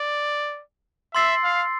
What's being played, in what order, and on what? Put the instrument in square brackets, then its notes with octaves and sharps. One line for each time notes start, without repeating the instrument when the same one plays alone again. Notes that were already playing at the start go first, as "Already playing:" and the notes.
Already playing: [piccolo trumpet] D5
[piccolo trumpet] E5 [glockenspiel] C6 E6 A6 C7
[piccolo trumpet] F5